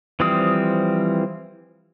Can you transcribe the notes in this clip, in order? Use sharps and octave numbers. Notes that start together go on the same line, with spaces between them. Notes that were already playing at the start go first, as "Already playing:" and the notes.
E3 F3 G3 C4 D#6